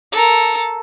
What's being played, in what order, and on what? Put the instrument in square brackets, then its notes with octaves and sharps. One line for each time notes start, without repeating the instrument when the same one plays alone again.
[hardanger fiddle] A4 A#4